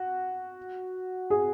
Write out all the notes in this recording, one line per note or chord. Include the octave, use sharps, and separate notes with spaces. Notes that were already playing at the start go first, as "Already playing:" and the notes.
Already playing: F#4
G#4